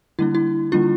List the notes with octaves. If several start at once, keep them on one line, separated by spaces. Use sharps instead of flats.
D3 G3 A#3 D4 E4
E4
D3 G3 A#3 D4 F4